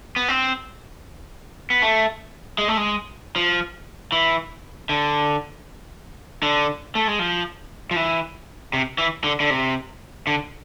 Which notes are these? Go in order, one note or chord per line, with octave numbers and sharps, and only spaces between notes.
B3
C4
B3
A3
G#3
A3
G#3
F3
E3
D3
D3
A3
G#3
F3
F3
E3
C3
E3
D3
D3
C3
D3